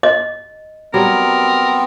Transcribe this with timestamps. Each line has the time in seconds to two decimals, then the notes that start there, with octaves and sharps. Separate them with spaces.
0.03 D#5
0.94 F#3 G3 B3 C4 A#4